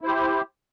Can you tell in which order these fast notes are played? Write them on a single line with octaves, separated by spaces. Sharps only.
E4 C5 G4